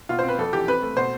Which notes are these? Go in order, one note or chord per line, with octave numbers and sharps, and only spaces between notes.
B2 F4
C4 C5
B4
F2 A4
E3 G4
C4 B4
A3
B2 C5